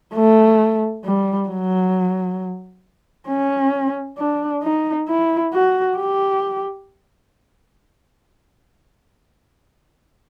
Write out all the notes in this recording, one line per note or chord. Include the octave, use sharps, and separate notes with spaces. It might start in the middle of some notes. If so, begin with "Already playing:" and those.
A3
G3
F#3
C#4
D4
D#4
E4
F#4
G4